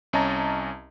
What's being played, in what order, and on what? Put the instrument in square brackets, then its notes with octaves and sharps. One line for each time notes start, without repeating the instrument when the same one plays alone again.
[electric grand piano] C2 C#4 D#5 A5 A#5